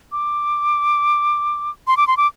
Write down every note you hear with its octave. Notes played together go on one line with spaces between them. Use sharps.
D6
C6
D6
C6
D6